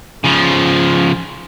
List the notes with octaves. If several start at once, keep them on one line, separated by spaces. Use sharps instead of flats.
C#3 F3